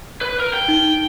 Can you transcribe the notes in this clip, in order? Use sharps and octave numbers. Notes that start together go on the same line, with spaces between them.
B4
A#4
G5
D#4